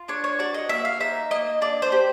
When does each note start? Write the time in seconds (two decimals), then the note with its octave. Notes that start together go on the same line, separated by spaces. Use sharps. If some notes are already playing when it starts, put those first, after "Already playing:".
Already playing: F4
0.08 D4 C#5
0.24 C#5
0.39 F#4 D5
0.54 D#5
0.69 A#3 E5
0.85 F5
1.00 D#4 E5
1.31 A#3 D#5
1.61 D4 D5
1.82 C5
1.92 G4